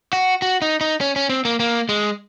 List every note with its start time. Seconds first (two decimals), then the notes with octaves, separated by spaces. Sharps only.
0.13 F#4
0.42 F#4
0.62 D#4
0.81 D#4
1.01 C#4
1.16 C#4
1.30 C4
1.45 A#3
1.60 A#3
1.89 G#3